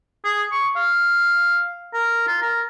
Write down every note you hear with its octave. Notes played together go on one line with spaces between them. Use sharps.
G#4
C#6
F5
A#4
F4
A#4